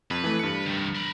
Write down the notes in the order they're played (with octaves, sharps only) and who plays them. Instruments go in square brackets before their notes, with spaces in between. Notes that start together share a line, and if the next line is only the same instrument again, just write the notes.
[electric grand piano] F2 [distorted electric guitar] B4
[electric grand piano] E3 A3
G2 C#7
[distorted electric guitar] C2 D#3
A#4 B5